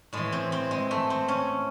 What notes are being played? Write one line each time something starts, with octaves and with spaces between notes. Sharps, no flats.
A2 E3 G#3
C4
C4
G#3
A3
C4
C#4